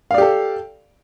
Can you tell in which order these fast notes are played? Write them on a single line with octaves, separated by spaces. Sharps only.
F5 D5 G4 A4